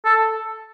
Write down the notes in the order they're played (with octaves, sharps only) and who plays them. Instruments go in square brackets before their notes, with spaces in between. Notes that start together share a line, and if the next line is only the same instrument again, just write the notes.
[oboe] A4